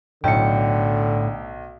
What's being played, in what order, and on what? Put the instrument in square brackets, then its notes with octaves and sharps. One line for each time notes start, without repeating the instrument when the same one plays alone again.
[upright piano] B1 [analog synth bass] A2 [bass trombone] D3 [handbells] G5 C#7